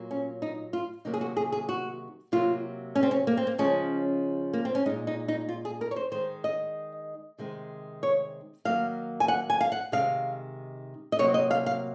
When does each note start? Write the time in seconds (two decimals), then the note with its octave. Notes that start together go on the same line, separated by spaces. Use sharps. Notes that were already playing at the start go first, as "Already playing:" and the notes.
Already playing: A#2 F#3 A#3
0.11 C#4
0.42 D#4
0.73 F4
1.05 C3 D#3 F#3 A#3 D#4
1.14 G#4
1.21 F#4
1.37 G#4
1.52 G#4
1.69 F#4
2.32 C3 F#3 A#3 F4
2.95 C#4
3.03 C4
3.11 C#4
3.27 A#3
3.37 C4
3.47 A#3
3.58 C#3 F3 G#3 C#4
4.53 A#3
4.65 C4
4.75 C#4
4.86 G#3 D#4
4.90 A#2
5.07 D#4
5.28 D#4
5.49 F4
5.65 G#4
5.81 A#4
5.91 C#5
5.96 C5
6.12 D#3 G#3 C5
6.44 D#5
7.38 C3 D#3 G#3
8.03 C#5
8.65 D#3 F#3 A#3 F5
9.20 G#5
9.28 F#5
9.50 G#5
9.61 F5
9.72 F#5
9.92 C3 D#3 G#3 F5
11.12 D#5
11.19 C3 F#3 A#3 C#5
11.34 D#5
11.51 F5
11.66 F5